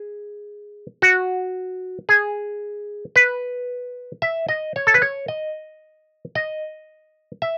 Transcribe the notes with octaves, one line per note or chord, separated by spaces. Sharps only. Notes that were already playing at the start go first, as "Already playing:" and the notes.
Already playing: G#4
F#4
G#4
B4
E5
D#5
C#5
A4
B4
C#5
D#5
D#5
E5